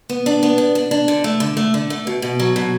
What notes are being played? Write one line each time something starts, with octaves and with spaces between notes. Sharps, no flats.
B3
D4
B3
D4
D4
D4
D3
A3
D3
A3
D3
A3
B2
B2
F#3
B2